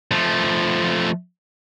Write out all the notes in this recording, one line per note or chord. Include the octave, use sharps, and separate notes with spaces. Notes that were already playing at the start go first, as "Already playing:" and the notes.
F3 A3